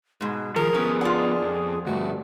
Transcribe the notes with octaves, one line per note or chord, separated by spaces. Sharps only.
G#2 B2 G#3
D#3 F3 G#4 A#4
F3 B3 C#4
D4 F4 F#5
F2
D2 G2 A3 F#4